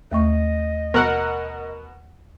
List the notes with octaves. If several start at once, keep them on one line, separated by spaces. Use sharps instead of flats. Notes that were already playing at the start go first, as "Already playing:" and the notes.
D#2 A3 D#5 C#6
B2 A#4 F#5